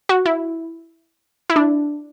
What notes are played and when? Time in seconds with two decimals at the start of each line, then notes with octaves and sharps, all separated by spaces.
0.09 F#4
0.26 E4
1.50 E4
1.56 D4